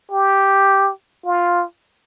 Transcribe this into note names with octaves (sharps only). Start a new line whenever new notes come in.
G4
F4